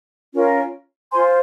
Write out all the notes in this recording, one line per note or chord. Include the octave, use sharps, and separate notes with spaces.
C#4 F4 A#4
F4 C5 G#5 C6